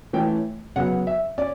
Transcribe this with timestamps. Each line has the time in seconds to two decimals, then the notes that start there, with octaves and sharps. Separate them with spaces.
0.13 E3 A3 C#4 G5
0.76 C#3 F#3 B3 F#5
1.07 E5
1.38 C#4 D5